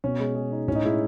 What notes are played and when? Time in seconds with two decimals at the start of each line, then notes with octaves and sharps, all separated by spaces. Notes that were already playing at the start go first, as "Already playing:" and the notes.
0.04 B2 C#4
0.20 G#3
0.35 G#4
0.52 D#4
0.68 A2 C#4
0.75 D#4
0.84 G#3 E4